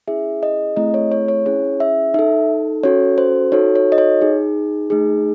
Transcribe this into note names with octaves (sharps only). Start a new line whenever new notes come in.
C#4 E4 G#4 E5
D#5
A3 C4 E4 G#4 D#5
C#5
C#5
C#5
C#4 E4 G#4 C#5
E5
D#4 A4 E5
C#4 F#4 A4 C#5
C5
D#4 F#4 A4 C#5
C#5
D#5
C#5
D#4 G#4
A3 D#4 G#4